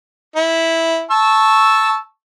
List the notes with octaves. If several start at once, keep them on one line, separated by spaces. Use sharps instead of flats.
E4
A5 C#6 E6